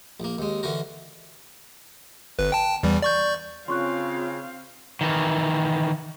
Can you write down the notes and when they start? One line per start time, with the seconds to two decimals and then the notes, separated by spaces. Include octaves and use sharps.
0.20 A#1 A#3
0.38 D#2 G#3
0.63 D3 E3 F#4 A#4
2.39 G1 B4
2.52 G5 A5
2.83 E2 E3 G3
3.02 D5 C#6 G6
3.68 C#3 C4 F4 F5 C6 C#6 F#6
5.01 D#3 E3